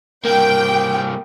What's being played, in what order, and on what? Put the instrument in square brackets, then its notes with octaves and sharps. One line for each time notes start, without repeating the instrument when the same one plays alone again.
[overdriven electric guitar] C2 A#3 [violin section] G5